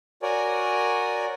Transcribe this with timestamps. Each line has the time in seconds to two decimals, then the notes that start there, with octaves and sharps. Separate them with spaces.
0.22 F#4 A#4 C#5 D5 G#5